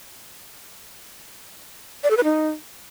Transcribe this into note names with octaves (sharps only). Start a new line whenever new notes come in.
D5
A4
B4
D#4